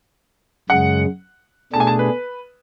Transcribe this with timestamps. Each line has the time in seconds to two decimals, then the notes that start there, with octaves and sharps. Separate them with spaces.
0.69 F#2 C#3 G#3 F#5
1.73 B2 A3 D4 G#4 A5
1.80 G#5
1.87 A5
1.99 B4